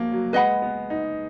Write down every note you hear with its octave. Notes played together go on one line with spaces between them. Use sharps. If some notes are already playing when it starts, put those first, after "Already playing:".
Already playing: F3 F#3 A#3
F#3
G#3 B4 D#5 F#5 B5
B3
D#4